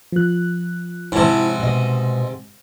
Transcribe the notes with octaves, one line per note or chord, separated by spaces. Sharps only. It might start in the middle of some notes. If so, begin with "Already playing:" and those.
F3 F#6
G#2 C3 E4 C#5 A5
B2 G#3 D#5